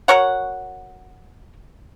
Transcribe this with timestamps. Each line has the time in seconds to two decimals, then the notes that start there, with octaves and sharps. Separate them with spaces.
0.08 F#4 A#4 C#5 F#5